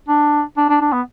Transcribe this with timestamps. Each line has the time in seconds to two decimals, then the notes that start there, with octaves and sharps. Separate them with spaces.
0.08 D4
0.57 D4
0.69 D4
0.81 D4
0.93 B3